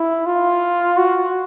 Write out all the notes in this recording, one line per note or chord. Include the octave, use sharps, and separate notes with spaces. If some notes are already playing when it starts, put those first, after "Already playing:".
Already playing: E4
F4
F#4